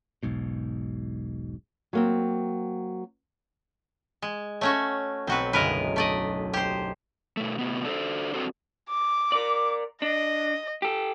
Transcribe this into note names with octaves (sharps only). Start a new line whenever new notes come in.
E1 B1 G#2 B2
F#3 A#3 C4
G#3
A3 C#4 F#4 C#5
B1 C4 F#4 B4
F#1 D2 G#3 A#4 B4
A3 D5 D#5 B6
G4 C5
B2 A3
A2 C3 B3
D4 A4 B4 C5
C4 D4 F#4 A4 C5
D6
A#4 D5
D4 D#5
G4 A4